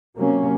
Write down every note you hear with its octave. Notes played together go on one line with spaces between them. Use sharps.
C3 F#3 A#3 C#4